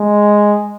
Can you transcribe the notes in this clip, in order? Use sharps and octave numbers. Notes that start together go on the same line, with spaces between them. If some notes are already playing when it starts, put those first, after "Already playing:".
Already playing: G#3